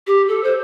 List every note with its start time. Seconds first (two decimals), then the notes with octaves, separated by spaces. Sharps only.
0.07 G4
0.28 A4
0.44 C5